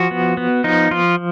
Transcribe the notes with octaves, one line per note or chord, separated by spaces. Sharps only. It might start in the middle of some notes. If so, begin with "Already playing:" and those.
Already playing: F3 F#4
B3
B3
F3 D#4
F3 F4